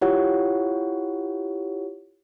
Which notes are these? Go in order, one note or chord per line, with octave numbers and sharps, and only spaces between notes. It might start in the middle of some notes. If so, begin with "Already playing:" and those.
E4 F4 G4 C#5 F#5